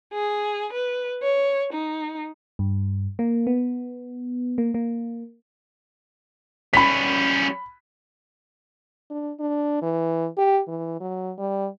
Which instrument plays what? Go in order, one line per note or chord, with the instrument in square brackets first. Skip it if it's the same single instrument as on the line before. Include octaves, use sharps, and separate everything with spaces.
[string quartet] G#4
B4
C#5
D#4
[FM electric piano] G2
A#3
B3
A#3
A#3
[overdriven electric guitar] G3 C#4 [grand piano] B5 B6
[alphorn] D4
D4
E3
G4
E3
F#3
G3